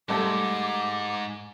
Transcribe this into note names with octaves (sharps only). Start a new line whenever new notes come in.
G#2 G3 A3 D6